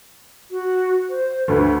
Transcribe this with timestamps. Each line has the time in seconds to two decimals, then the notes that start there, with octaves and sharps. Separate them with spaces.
0.51 F#4
1.10 C5
1.48 D2 D3 B4